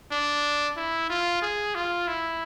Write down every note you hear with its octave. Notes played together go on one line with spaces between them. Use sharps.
D4
E4
F4
G#4
F4
E4